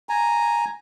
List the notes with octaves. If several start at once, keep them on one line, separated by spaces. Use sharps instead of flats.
G#5 A#5